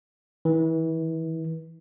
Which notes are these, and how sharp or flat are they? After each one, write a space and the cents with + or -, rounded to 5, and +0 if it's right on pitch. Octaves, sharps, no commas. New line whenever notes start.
E3 -30